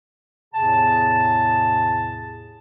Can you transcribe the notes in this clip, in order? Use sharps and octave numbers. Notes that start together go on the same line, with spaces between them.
E2 A2 C3 G#4 A5